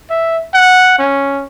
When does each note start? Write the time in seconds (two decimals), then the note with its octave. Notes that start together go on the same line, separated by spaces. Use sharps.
0.10 E5
0.54 F#5
0.99 C#4